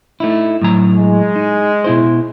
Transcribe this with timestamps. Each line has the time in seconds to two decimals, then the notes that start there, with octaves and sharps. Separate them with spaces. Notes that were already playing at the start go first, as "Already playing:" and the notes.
0.20 A3 D#4 E4
0.62 A2 F#3 A#5
0.96 G#3
1.36 D#4
1.84 B2 E4 C5